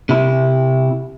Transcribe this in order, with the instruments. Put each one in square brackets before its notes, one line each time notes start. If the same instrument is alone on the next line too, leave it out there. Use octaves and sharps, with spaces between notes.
[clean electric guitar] C3 E4